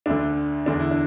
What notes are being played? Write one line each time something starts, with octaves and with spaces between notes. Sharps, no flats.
D2 D3 D4
E2 D3 D4
E4
D4